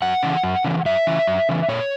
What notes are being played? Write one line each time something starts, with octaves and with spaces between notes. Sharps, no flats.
F#2 F#5
C#3 E3
F#2
C#3 E3
F#2 E5
C#3 E3
F#2
C#3 E3
A#2 C#5